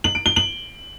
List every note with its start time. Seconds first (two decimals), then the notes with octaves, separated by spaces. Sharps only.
0.04 F#7
0.15 D7
0.26 G7
0.36 F#7